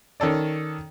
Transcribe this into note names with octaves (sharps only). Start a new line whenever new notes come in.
D#3 C#4 A4 D5